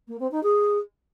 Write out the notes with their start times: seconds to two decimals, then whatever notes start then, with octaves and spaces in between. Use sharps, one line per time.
0.08 A#3
0.20 C4
0.31 D#4
0.43 G#4